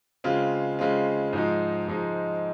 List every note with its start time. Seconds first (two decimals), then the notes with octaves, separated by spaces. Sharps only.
0.24 C#3 G#3 C4 F4
0.79 C#3 G#3 C4 F4
1.33 G#2 F3 G#3 D#4
1.88 G#2 F3 G#3 D#4